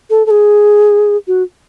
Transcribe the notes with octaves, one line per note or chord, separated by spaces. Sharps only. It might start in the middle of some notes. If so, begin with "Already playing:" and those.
A4
A4
G#4
F#4